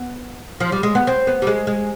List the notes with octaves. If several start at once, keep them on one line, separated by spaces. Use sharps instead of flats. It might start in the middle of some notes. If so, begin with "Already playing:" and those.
Already playing: B3
F3
G3
G#3
B3
C4
B3
G3
G#3
G#3